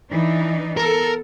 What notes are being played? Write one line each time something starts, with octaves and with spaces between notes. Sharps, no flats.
E3 D4 D#4
B3 A4 A#4